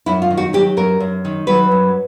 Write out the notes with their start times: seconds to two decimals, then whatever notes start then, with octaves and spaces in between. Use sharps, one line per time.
0.06 F#2 E4
0.22 F4
0.31 D#3
0.37 F#4
0.53 F#3 G4
0.77 F#2 A#4
1.00 F#2
1.25 D#3
1.47 F#3 B4
1.71 F#2